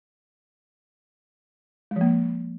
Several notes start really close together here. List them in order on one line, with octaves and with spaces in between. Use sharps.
G#3 F3 A#3